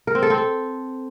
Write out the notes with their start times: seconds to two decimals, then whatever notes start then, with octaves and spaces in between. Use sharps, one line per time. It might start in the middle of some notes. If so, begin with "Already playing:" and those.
0.07 A#4
0.15 C4
0.23 A4
0.30 C4
0.38 A4